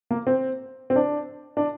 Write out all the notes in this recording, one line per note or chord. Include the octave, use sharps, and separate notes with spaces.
A#3
C4
C4
D4
D4